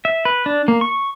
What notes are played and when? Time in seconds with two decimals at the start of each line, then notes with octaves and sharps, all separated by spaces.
0.05 E5
0.25 B4
0.46 D4
0.68 A#3
0.81 C#6